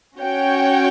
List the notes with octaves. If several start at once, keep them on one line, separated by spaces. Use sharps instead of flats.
C#4 F#4 C#5 G5